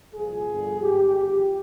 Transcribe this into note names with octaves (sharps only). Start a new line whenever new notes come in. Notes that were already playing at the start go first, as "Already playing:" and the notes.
C2 A#2 F3 G#4
G1 G2 D3 F3
G#1 G#2 D#3 G4
G1 G2 F3 G4